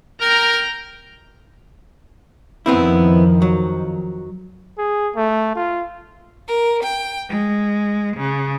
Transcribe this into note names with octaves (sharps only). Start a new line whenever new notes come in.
A#4 G5 A#5
F2 D#3 F3 B3 C4 E4
F#3
G#4
A3
F4
A#4
G5
G#3
C#3